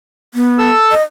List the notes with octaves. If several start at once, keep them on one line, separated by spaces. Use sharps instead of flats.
B3
A4 E6
D#5